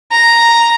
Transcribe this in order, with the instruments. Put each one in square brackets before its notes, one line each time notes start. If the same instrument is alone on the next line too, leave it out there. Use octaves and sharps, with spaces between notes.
[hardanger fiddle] A#5